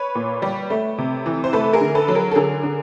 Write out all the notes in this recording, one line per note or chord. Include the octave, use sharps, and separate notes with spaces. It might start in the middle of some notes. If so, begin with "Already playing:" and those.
Already playing: B4 C#5
A#2
G3
A3
C3
E3
C5
A3 A4 B4
G#4 A#4
D3
A4 B4
F#3
G#4 A#4
A4
D3 G#4 A#4
D3